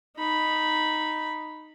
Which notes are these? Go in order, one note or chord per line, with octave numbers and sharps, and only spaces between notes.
D#4 B5